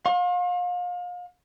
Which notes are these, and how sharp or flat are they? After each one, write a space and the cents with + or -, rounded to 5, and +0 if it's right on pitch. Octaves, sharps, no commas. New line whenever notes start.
F5 +35 C6 +45